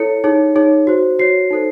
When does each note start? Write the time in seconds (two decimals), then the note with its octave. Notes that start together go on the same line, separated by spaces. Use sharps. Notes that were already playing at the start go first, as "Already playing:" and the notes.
Already playing: E4 A4 C#5 C#7
0.24 D#4 G#4 C#5
0.56 D#4 G#4 C#5
0.87 F#4 C5
1.19 F#4 C#5 C7
1.51 D#4 A4 C5